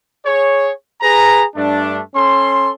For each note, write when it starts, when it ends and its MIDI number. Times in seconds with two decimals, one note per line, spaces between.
0.25 0.71 68
0.25 0.71 73
1.01 1.44 68
1.01 1.44 71
1.01 1.44 82
1.55 2.00 43
1.55 2.00 57
1.55 2.00 62
2.15 2.71 61
2.15 2.71 69
2.15 2.71 84